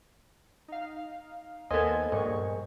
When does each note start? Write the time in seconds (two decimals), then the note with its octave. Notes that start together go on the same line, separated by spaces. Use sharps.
0.68 D#4 F5
1.71 D#2 A#3 B3 A4 C5 D#5 G#5 G#6
2.12 A#1 G2 G#3 C#6